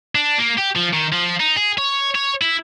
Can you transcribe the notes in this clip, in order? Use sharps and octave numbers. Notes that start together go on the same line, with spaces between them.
D4
A#3
G4
F3
D#3
F3
D#4
G#4
C#5
C#5
E4